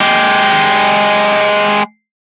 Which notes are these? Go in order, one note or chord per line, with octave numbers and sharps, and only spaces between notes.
G#3 G4